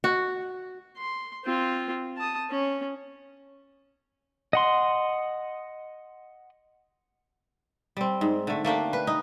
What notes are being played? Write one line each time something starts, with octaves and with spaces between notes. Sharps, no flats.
F#4
C6
C4 F4
A5 D#6
C#4
D#5 F#5 C6
G3 C4
G#2
D3 A3
A3 A#3 D4 G4
B4
D#4